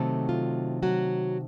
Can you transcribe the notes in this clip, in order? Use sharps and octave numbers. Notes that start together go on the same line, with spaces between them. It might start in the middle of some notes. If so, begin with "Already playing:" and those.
Already playing: C3 D#3 F#3 A3 C4 A4
F4
F#3 F#4